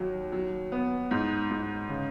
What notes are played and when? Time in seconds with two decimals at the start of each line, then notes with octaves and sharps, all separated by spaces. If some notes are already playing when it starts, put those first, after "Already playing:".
Already playing: D#2 F#3
0.32 F#3
0.72 B3
1.11 G#2
1.50 G#2
1.89 C#3